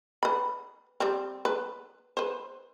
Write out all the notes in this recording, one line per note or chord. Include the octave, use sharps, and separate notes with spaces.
B4 B5
G3 C4
B4
B4 C5